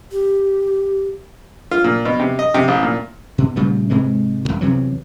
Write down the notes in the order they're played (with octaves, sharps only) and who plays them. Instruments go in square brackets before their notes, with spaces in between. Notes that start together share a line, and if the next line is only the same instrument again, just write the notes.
[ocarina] G4
[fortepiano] F4
A#2
B2
C3
D#5
C3
A1
A#2
[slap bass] B2
A#2 C#3 G3 A3
G#2 C3 E3 G#3
E1 G#2
E2 C3 E3 F#3